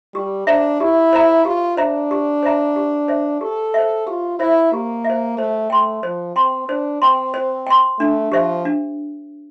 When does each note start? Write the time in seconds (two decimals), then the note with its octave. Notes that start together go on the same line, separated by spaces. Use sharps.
0.14 G3 G4
0.47 D4 C5 E5 A#5
0.80 E4 G4
1.13 C5 E5 A#5
1.45 F4 G4
1.77 D4 C5 E5 A#5
2.11 G4
2.43 C5 E5 A#5
2.76 G4
3.08 C5 E5
3.41 G4 A4
3.74 C5 E5
4.07 F4 G4
4.39 E4 C5 E5
4.72 A#3 G4
5.04 E5
5.10 C5
5.37 A3 C5
5.70 A3 G5 C6
6.03 F3 C5
6.36 C4 G5 C6
6.68 D4 C5
7.02 C4 G5 C6
7.34 C5
7.67 G5 C6
7.99 A3 D4
8.32 F3 G4 C5 E5
8.65 D4